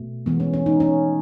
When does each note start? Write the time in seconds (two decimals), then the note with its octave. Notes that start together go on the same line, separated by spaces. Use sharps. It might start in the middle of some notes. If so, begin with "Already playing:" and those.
Already playing: B2 A3
0.26 E3 G#3 B3
0.40 C#4
0.54 C#4
0.66 D#4
0.80 C#4